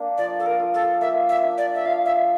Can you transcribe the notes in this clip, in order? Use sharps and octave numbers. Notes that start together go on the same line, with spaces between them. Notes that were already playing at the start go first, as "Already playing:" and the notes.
Already playing: A#3 D4
F3 D5
A4
A#4
F4
A4
A#3 E5
E5
D4
D5
E5
F3 F5
E5